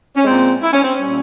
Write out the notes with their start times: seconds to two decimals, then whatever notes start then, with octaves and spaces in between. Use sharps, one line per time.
0.16 C#4
0.25 A#2 G#3 C4
0.62 E4
0.73 C#4
0.83 C4
0.94 C#4
1.00 A#2 G3